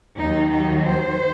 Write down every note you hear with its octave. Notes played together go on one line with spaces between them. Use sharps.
D#2 D#3 F#3 D#4
D#4
C5